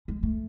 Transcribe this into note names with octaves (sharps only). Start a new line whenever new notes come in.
G#3
A3